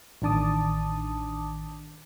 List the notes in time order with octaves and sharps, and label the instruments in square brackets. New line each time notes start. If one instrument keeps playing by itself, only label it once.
[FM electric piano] A1 D#3 D4 A5 D6 D#6